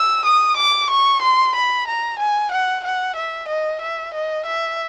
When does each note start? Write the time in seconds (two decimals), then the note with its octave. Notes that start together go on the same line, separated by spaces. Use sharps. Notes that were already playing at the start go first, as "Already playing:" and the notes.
Already playing: E6
0.26 D#6
0.57 D6
0.91 C#6
1.22 C6
1.55 B5
1.88 A#5
2.19 G#5
2.52 F#5
2.84 F#5
3.16 E5
3.49 D#5
3.81 E5
4.14 D#5
4.46 E5